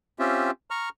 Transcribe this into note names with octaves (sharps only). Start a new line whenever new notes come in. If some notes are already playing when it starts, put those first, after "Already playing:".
C4 C#4 F4 G4 E5
A#5 C#6 F6